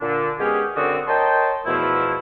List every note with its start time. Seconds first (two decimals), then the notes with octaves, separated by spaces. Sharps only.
0.01 A#2 D3 D4
0.39 G#3 B3 C#4 G4 G#4
0.76 F#2 D3 C4 F#4 D5 D#6
1.08 A#4 C#5 D#5 G5 A5 C6
1.66 E2 B2 F3 A3 E4